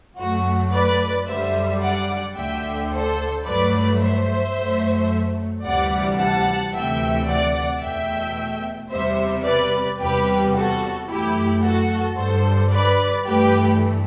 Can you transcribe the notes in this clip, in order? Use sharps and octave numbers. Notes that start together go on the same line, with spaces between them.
F#2 F#3 A3 F#4
B4 D5
F#2 D3 G3 C5 E5
D5 F#5
D2 D3 A3 E5 G5
A4 C5
G2 F#3 A3 B4 D5
C5 E5
F#2 F#3 A3
D2 C3 E3 G3 D5 F#5
F#5 A5
D2 C3 E3 A3 E5 G5
D5 F#5
E2 B2 A3 E5 G5
E2 C3 G3 C5 E5
B4 D5
E2 C3 G3 G4 B4
F#4 A4
F#2 E3 A3 E4 G4
F#4 A4
G2 D3 G3 A4 C5
B4 D5
G2 E3 A3 G4 B4